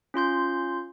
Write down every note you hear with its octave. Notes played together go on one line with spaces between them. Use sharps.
C#4 F4 C6 G6